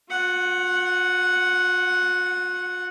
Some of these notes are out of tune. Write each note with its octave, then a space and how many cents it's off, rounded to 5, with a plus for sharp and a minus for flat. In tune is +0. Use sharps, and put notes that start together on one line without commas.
F4 +45 F#5 +0